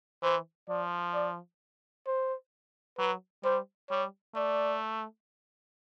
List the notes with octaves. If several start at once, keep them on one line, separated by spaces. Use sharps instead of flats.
E3 C5
F3 D5
D5
C5
F#3 B4
G3 C5
G3 C#5
A3 D5